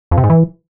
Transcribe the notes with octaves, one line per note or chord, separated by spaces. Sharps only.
F2
C3
G#2
E3